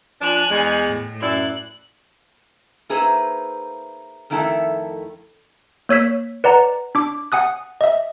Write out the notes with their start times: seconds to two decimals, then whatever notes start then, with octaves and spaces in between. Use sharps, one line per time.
0.21 F3 D4 G#5 F6 F#6
0.50 E2 G#3
0.88 A2
1.21 F#2 E4 D5 F#6
2.89 A#3 D#4 G#4 B4 C5 E5
4.30 F2 D#3 A3 E4 A4 A5
5.89 A#3 C#5 E6 B6
6.44 B4 D5 F#5 A#5
6.95 D4 D6
7.32 F#5 G#5 D#6 F#6
7.81 D#5 E5